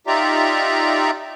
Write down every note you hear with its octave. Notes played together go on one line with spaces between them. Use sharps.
D#4 F4 G4 D5 E5 A#5